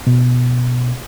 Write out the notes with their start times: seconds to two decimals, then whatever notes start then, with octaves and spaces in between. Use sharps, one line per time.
0.07 B2